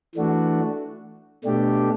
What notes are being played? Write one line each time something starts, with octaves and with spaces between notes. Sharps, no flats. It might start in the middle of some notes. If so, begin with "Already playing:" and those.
E3 A3 D4 F#4
B2 A3 D4 G4